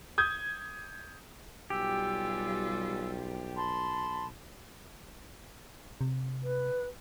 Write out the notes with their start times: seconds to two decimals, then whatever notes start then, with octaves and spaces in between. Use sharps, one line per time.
0.18 D#6 G6 G#6
1.70 B1 G3 F4 G4 G#5 E6
3.56 A5 B5 C6
6.01 C3
6.43 B4